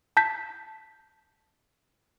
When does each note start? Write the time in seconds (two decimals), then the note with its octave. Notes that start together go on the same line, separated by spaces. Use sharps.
0.17 A5 G6 B6